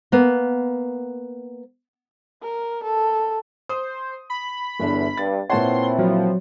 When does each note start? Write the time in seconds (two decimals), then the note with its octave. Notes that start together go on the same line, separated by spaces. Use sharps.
0.12 A#3 B3
2.42 A#4
2.84 A4
3.69 C5 D#6
4.30 B5
4.80 G1 E2 D4 E4
5.17 G2 A6
5.50 A#2 C4 E4 B4 C#5 F#5 A5 C6
5.99 F3 F#3